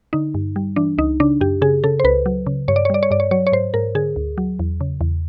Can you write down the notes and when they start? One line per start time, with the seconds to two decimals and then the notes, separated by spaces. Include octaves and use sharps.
0.13 D3 D#4
0.34 G2
0.56 G3
0.76 E3 D4
0.98 C#2 D#4
1.20 C#3 D4
1.41 F#2 G4
1.62 C#3 G#4
1.84 C#3 A4
2.00 C5
2.04 C#2 B4
2.26 F#3
2.47 C#3
2.68 G2 C#5
2.76 D5
2.85 C#5
2.90 G3 D5
3.03 C#5
3.11 G2 D5
3.20 C#5
3.31 F#3 C#5
3.47 C#5
3.52 G#2 C5
3.74 G#2 A#4
3.95 D3 G#4
4.16 D2
4.38 F#3
4.59 E2
4.81 C#3
5.01 E2